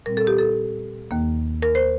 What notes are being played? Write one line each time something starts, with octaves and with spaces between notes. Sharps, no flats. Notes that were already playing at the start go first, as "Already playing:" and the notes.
A#2 G3 C4 A#4
A4
G4
A4
D#2 D#3 A#3
A#4
C5